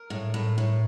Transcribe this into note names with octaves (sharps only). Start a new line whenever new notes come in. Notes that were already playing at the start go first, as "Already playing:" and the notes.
Already playing: A#4
A2
A2
A2